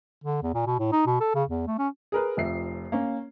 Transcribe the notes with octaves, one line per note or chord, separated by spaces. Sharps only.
D3
E2
A#2
B2
A2
D#4
B2
A4
C#3
E2
A3
C#4
G#4 A#4 B4
F1 F2 E5 C7
A#3 C#4